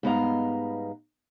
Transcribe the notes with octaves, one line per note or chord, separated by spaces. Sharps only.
G#2 G3 B3 D#5 F5 A#5